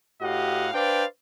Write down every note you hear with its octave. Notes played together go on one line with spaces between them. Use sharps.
A2 F#4 G4 D#5 F5 F#5
D4 B4 C5 D5 F5 G5